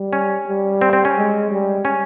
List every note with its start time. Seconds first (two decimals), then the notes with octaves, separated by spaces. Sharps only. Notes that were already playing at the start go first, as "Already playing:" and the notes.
Already playing: G3
0.13 C#4
0.47 G3
0.81 C4
0.93 C4
1.05 C#4
1.17 G#3
1.51 G3
1.85 C#4